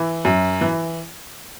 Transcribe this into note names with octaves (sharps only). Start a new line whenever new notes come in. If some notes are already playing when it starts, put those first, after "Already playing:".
Already playing: E3
F#2
E3